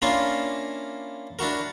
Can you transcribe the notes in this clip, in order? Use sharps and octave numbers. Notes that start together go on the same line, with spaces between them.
A#3 C#4 D4 E4 F4 A#4
D4 E4 F#4 A#4